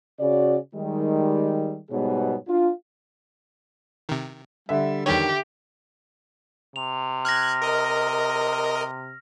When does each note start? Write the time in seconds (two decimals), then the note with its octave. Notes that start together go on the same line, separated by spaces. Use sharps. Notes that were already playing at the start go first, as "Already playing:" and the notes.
0.19 C#3 F#4 D5
0.75 D#3 G3 G#3
1.90 G#2 B2 G3 B3 G#4 C#5
2.48 D4 F4
4.09 C3 D#3
4.69 D3 G3 E5
5.06 E2 D#3 G3 G4 C#5
6.76 C3 F7
7.25 F6 F#6 G#6 A#6
7.62 A#4 D#5